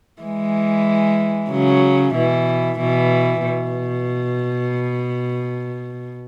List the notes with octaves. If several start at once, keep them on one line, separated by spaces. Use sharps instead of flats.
E3 G#3
C#3 F#3
B2 E3
B2 E3
B2